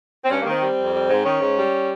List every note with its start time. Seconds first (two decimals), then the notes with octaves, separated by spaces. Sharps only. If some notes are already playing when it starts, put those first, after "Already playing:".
0.25 C4
0.30 G2 C#4
0.41 D#3 A#3
0.51 C4
0.61 G3
0.78 F2
0.94 G3
1.10 G#2
1.25 D#3 C#4
1.40 G#2
1.57 G3